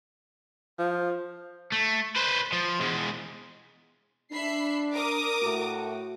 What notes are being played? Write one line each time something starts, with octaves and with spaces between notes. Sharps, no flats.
F3
A3
B4 C5
F3
E2 G#3
D4 E5 B5 C7
A#4 D6 D#6
A2 A3 F#4